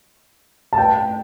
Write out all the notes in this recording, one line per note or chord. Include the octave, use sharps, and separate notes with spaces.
A5
G5